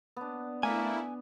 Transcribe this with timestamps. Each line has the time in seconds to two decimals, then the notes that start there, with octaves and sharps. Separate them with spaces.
0.17 B3 D4
0.63 A3 A#3 E4 G#5